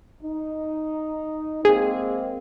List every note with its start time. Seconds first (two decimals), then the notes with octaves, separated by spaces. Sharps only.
0.22 D#4
1.65 G#3 A#3 C4 G#4